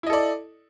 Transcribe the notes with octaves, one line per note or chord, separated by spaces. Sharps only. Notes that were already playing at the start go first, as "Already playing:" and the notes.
E4 A4 D5 D#5